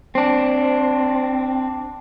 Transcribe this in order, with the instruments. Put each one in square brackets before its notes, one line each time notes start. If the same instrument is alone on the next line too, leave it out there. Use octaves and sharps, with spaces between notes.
[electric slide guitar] C4 D4